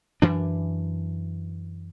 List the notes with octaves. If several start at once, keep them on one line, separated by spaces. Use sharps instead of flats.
F#2 E3 D4